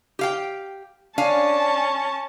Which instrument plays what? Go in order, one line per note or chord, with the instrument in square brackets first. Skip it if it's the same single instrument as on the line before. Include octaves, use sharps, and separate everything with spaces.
[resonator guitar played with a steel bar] G4 F5 G5
[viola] C#4 A5 [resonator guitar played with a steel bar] D4 F5 G#5